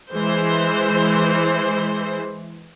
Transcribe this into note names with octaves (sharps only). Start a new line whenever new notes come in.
E3 G#3 C5